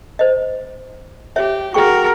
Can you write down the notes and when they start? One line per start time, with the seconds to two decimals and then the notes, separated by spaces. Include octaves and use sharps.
0.19 C5 D#5
1.36 G4 C#5 E5
1.74 F#4 G#4 A#4 G5 C#6